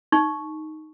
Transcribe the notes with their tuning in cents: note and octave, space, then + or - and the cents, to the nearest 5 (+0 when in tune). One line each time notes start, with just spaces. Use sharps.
D#4 +0 C#6 +0